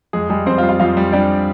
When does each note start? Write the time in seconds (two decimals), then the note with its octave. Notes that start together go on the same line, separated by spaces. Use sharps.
0.13 F2 G#3 G#4
0.30 G3 G#3 G#4
0.46 F2 C4 C5
0.58 F4 F5
0.63 G3
0.69 F4 F5
0.80 F2 F4 F5
0.97 G3
1.13 G3 D4 D5